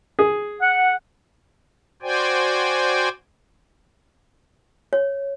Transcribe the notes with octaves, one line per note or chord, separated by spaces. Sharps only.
G#4
F#5
F#4 C5 D5 G5 G#5
C#5